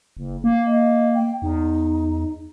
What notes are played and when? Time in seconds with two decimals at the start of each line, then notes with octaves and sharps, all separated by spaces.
0.17 F#1
0.44 A#3
0.66 D#5
1.15 G5
1.42 E2 D#4